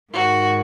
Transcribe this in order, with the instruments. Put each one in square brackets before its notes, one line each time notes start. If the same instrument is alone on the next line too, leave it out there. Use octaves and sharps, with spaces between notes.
[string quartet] G#2 D#3 F#4